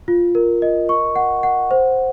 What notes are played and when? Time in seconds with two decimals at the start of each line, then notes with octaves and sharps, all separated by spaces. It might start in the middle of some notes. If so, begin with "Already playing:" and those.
0.08 F4
0.35 A#4
0.62 D#5
0.89 C#6
1.16 F#5
1.43 F#5
1.71 C5